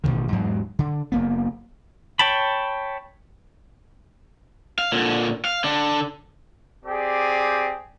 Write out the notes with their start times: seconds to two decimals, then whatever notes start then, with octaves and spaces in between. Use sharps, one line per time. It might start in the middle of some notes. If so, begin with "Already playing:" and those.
0.04 A1 B2 D3 D#3
0.32 E2 G#2 F#3 G#3
0.79 D3
1.12 F#1 A#3 B3
2.19 C#5 G5 A5 B5
4.79 F5
4.92 A#2 D3
5.45 F5
5.64 D3 D4
6.85 C4 G4 G#4 D5